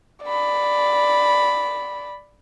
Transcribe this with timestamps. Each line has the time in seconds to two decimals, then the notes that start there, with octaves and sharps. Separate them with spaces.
0.24 D5 B5